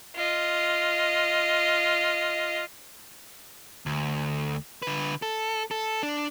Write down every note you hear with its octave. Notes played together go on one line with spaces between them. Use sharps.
F4 D#5
D2
D3 B4
A4
A4
D4